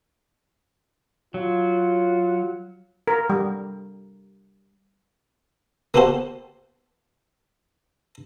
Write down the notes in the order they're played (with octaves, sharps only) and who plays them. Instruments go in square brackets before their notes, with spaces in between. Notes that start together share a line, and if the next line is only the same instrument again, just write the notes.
[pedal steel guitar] F#3 [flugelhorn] F4
[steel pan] A#4
G3
[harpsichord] A#3 B3 F#4 G4 A4 C5